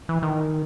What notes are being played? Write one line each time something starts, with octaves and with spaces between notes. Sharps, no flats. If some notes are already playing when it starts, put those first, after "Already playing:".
E3
D#3